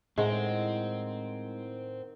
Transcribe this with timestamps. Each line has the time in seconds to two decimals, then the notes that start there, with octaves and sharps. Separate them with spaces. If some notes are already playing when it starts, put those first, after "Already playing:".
0.18 A2 D#3 G#3 C4 F#5